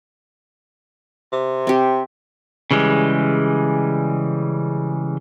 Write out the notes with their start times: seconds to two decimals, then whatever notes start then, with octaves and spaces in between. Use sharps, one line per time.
1.33 C3
1.67 C4 G4
2.71 C#3 E3 G3 G#3